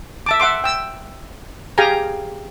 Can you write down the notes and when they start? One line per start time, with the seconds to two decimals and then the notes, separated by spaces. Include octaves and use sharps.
0.26 E5 A5 D6
0.40 E5 F#5 C6 D6
0.64 G5 E6
1.78 G4 G#4 F5 G5 G#5 A#5